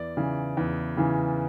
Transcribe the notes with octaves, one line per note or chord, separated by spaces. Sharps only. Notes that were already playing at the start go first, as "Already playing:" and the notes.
Already playing: E2 D5
C#3 E3
E2
C#3 E3